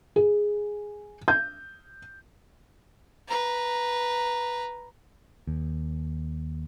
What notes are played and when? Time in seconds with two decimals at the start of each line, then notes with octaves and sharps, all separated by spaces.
0.16 G#4
1.28 G6
3.27 B4 A#5
5.47 D#2